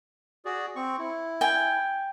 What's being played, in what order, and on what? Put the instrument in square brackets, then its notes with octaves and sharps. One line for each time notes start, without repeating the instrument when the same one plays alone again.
[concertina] F#4 G#4 D5
C4 C#6
E4
[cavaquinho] G5 G#5